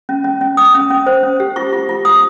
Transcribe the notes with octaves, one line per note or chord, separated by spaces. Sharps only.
C#4
C#4
C#4
C#4 D#6
C#4
C#4
C5
C#4
G4
F4 C#6
F4
F4
F4 D#6